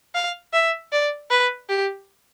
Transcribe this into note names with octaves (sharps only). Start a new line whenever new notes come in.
F5
E5
D5
B4
G4